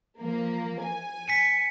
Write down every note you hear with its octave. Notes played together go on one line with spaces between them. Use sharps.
F3 A#3
G#5
B6 C#7 D#7